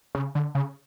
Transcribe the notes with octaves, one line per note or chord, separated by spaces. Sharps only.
C#3
D3
C#3